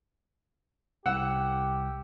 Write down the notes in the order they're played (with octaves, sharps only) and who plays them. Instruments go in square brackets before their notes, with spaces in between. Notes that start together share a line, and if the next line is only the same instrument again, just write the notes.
[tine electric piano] C2 E6 [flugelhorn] G4 [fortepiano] F#5